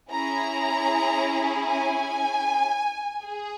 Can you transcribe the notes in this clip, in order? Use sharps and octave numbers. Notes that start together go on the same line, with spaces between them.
C#4 E4 G#4 A#5
G#5
G#4